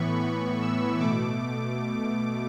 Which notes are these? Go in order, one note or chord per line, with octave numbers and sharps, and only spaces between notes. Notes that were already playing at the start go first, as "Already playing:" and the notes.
Already playing: A2 E3 B3 B5 C#6
B5
E6
B2 A3 D6